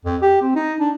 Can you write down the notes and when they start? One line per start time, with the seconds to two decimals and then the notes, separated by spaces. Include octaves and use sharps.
0.05 F2
0.22 G4
0.42 C4
0.55 D#4
0.80 D4